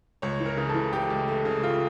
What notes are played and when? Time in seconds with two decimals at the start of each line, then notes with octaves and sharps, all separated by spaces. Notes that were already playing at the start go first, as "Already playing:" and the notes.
0.22 C#2 C#5
0.40 E3
0.46 A#4
0.57 C#3
0.69 A4
0.75 E3
0.92 A3 G4
1.10 C#2
1.28 A3
1.45 C#3
1.63 A3 F4